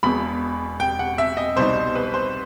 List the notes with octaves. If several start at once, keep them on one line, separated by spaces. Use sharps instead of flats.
E1 E2 B2 B5
G5
F#5
E5
D#5
C2 B2 G3 D#4 C5
B4
C5